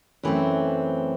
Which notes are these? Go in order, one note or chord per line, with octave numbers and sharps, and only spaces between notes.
F#2 E3 A3 C4